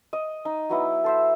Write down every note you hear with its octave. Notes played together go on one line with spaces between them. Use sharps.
D#5
D#4
F#3 B3 E4
A4 C5 E5